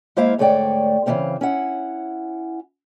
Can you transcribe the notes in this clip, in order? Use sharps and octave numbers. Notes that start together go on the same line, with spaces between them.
G#3 A#3 E4 C5 E5 F5
D2 G#2 A3 C#5 D5 G5
C#3 E3 F#3 A3 C4 F5
C#4 E4 F#5